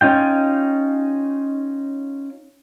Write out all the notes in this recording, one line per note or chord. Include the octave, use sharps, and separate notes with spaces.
C#4 D#4 F4 G5